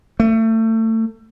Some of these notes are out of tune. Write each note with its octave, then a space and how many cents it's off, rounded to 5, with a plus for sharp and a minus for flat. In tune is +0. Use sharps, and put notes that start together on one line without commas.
A3 +30